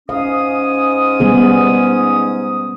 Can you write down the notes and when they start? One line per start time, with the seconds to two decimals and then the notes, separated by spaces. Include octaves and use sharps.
0.09 G#2 C#4 F5 D#6
1.20 G3 B3 G#4